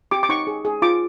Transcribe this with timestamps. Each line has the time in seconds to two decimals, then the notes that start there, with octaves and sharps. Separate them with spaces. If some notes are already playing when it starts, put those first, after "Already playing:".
0.11 G4 D6
0.23 D6
0.29 D#4 C#6
0.47 G#4
0.65 G#4
0.82 F4 D6